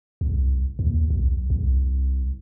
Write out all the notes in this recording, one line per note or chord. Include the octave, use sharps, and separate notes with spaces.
C2
D#2
B1
C2